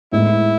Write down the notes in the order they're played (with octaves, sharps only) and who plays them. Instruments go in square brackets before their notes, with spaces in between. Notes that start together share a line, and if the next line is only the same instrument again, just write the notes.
[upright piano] A2 G#3 B3 D#4 [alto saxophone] E4